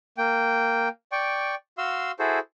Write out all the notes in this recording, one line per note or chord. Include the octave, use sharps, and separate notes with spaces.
A#3 G5
D5 G5 C#6
F#4 F5 C6 E6
E4 F#4 G#4 A4 C5